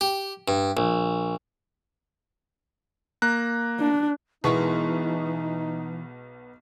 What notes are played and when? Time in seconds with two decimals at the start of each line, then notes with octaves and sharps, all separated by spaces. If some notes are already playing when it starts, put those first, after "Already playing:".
0.01 G4
0.48 G2
0.77 A#1
3.22 A#3 A#5 F#6
3.80 D4
4.44 B1 E3 G#3 B3 D#4 E4 A#4 C#6